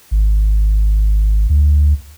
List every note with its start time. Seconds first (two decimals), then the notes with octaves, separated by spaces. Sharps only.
0.11 G#1
1.50 D2